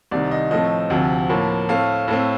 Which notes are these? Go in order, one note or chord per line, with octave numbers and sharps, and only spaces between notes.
C2 C3 D#3 D5
D#5
A2 F3 A3 C4 D#5
D2 C3 F3 C4
A2 F3 A#3
A2 A3 C4 F5
A2 A3 C4